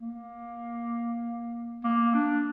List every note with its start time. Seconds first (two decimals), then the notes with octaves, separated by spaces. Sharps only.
0.01 A#3
1.84 A#3
2.14 D4